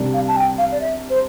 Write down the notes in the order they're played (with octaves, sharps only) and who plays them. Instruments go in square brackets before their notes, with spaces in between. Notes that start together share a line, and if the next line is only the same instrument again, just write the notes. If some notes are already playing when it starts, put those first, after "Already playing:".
Already playing: [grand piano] C2 C3 G3 D4
[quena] F5
A5
G5
F5
D5
E5
C5